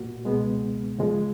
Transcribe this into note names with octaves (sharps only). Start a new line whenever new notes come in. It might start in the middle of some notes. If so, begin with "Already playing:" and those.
Already playing: A#2 A#3 F#4
C#2 B2 G#3 B3
C#3 F3 G#3